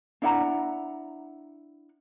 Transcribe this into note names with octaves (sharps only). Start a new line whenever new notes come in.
D4 E4 F#5 A#5